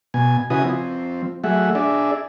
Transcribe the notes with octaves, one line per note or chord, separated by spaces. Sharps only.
B2 G#5
C#3 E4 F#4 B4 G#5 D#6
F3 C4
F#3 A3 G#4 E5 F#5
D4 G#4 D5 E5